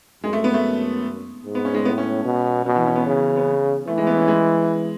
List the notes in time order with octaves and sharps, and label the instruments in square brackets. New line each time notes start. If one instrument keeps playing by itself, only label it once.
[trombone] F#2 [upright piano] G#3
[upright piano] A3
B3
A3
[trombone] G#2
[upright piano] B3
C#4
G#3
[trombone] A2 [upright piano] B3
[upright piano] C#4
[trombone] B2
[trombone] B2 [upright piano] F#3
[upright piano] E3
C#4
B3
[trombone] C#3
[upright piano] B3
[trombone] E3 [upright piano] A3
[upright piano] G#3
B3
C#4
G#3